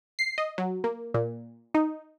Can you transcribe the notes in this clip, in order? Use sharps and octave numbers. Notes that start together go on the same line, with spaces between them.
C7
D#5
F#3
A#3
A#2
D#4